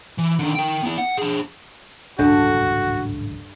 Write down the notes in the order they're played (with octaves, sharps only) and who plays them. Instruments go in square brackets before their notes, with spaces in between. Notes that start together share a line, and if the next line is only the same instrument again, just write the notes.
[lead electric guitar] E3
D3 D#3
A#4 G5
B3 E4
F#5
D4 G#4
[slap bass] D1 G#1 C#2 [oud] G2 A4 D#5 [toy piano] D4 [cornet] F#4